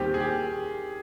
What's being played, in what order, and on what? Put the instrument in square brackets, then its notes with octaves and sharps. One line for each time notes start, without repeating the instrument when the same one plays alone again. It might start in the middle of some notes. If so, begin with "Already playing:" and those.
Already playing: [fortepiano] D#2 D#3 G3 C4 [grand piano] G4
[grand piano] G#4
G4